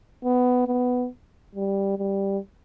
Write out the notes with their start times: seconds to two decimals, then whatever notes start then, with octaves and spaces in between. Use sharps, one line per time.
0.24 B3
0.67 B3
1.55 G3
1.98 G3